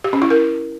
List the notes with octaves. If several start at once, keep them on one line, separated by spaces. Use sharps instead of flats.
G4
C#4
E4
A#4